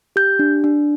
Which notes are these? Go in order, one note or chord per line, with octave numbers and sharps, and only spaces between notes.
G4 G6
D4
D4